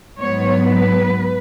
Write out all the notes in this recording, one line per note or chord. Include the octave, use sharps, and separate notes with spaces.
G#2 F#3 B3 C#5
B4